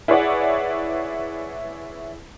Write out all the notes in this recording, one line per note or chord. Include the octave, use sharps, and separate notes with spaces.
E4 G#4 B4 C#5 D5 F#5